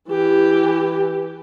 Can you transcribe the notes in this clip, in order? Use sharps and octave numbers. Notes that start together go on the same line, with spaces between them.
E3 G4